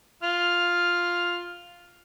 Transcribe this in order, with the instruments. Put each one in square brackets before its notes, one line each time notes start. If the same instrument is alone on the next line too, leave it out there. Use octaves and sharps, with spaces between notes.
[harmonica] F4 F6